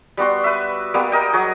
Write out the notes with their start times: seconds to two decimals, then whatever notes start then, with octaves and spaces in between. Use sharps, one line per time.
0.17 G3 B3 F#4 C6
0.44 B4 E5
0.94 G3 A#3 B3
1.12 A#4 D#5 G5
1.33 F#3 F#4 G#4